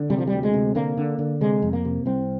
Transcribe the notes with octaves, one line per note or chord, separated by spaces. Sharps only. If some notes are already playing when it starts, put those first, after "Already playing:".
Already playing: D3
C3 G3
F3
G3
D2
G#3
C3
D3 A#3
D3
D3
C3 G#3
F2
A#3
C3
C2 C4